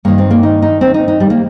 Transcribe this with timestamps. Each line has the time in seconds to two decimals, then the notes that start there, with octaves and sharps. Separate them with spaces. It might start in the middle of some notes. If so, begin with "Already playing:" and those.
0.05 G2 D#3 A#3
0.18 C4
0.31 A#3
0.43 D#4
0.62 D#4
0.81 C4
0.94 D#4
1.08 D#4
1.20 G3
1.30 A#3